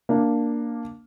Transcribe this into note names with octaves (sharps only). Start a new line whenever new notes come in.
A#3 D4